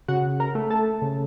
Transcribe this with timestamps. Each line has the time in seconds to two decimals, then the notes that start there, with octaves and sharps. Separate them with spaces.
0.08 C#3 F#4 F#5
0.40 A#4 A#5
0.55 A3
0.70 A4 A5
1.02 C#3